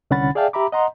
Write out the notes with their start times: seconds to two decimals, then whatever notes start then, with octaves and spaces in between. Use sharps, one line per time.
0.11 C2 D3 C#4 F#5 B5 A6
0.35 G#4 D5 E5 F5 G5 A5
0.53 G4 E5 A#5 B5 D6
0.72 D#5 F#5 A#5 C6